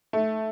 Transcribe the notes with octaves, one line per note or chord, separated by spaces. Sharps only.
A3